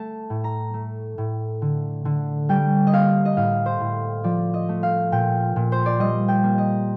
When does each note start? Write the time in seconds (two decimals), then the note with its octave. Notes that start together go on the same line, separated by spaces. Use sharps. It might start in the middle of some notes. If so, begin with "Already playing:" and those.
Already playing: A3 A5
0.30 A2
0.44 A#5
0.74 A3
1.18 A2
1.62 D3
2.05 D3
2.49 G3 G5
2.87 D#5
2.93 A#3 F5
3.25 D#5
3.37 A2 F5
3.66 C5
3.81 A2
4.24 F3 D5
4.54 D#5
4.69 A3
4.83 F5
5.12 A#2 G5
5.56 A#2
5.72 C5
5.86 D5
5.99 G3 D#5
6.28 G5
6.43 A#3
6.58 D#5